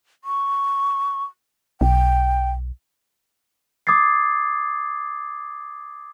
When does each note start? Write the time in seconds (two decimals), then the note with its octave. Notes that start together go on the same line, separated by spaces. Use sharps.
0.24 C#6
1.81 B1 G5
3.87 D6 D#6 G#6 A6 C7